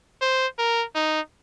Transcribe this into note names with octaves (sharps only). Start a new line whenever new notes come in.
C5
A#4
D#4